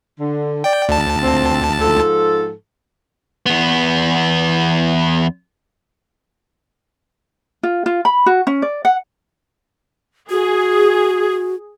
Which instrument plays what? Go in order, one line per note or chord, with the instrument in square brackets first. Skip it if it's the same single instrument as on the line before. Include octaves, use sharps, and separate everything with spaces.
[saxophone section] D3
[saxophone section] D5 [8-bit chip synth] G5
[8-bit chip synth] D2 A5
[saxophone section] A#2 C4
G#2 F3 A4
[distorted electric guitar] E2 B3
[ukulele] F4
F4
B5
F#4
C#4
D5
F#5
[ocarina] F#4 [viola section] G#4